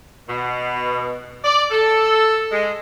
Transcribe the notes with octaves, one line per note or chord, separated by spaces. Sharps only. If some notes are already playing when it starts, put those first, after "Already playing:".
B2
D5
A4
G#3